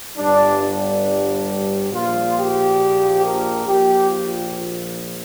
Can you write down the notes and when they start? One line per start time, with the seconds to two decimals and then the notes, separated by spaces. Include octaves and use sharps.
0.17 G1 G2 G3 D4
0.62 D4
1.92 A#1 A#2 F3 F4
2.36 G4
3.23 A#4
3.67 A#1 A#2 F3 G4
4.10 F4